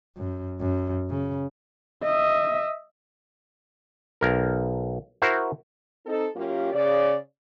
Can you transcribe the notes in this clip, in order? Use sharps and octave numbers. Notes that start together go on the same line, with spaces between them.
F#2
F#2
C#3
D#5 E5
B1 A#4
E4 F#4 A#4 C5
C4 D#4 A4
F#2 A#3 C#4 F4 G4
C#3 D5